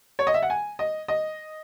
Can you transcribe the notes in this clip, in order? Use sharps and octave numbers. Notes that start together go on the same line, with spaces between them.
C#5
D#5
E5
F#5
G#5
D#5
D#5